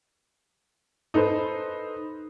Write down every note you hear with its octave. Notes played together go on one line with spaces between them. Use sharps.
D#4 A4 B4 C5